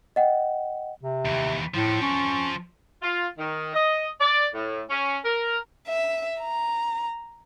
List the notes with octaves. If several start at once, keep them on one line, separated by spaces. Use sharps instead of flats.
D#5 F#5 G5
C3
D#2 E3
A2 F3 A4
C#4
F4
D#3
D#5
D5
A2
C#4
A#4
E5
A#5